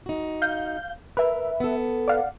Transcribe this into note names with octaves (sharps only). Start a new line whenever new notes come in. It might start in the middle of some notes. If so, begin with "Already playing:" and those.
D#4 F#4
F5 G6
A#4 B4 E5
B3 A4
D5 F5 F#5